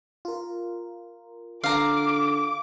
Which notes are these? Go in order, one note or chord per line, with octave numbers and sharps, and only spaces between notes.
F4 A#4
D3 F5 A#5 D6